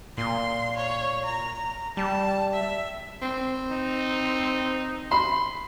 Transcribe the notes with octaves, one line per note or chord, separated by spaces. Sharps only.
A#2 C6
C#5
A#5
G3 A5
E5
C4
D#4
B5 C6